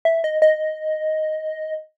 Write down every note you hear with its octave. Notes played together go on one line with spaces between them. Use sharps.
E5
D#5
D#5